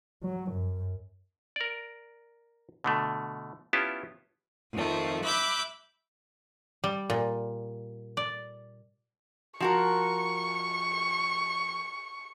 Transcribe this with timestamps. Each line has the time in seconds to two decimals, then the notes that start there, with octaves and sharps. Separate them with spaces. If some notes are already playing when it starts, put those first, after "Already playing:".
0.23 F#3
0.52 F#2
1.56 A#4 D5
2.84 B2 D3 A3
3.73 B3 C#4 E4 F4 G4 A5
4.73 F2 D#3 F3 A3
5.24 E5 B5 D6 F#6 G6
6.84 G3
7.10 A#2
8.17 D5
9.60 F3 F#4 A#4 C#6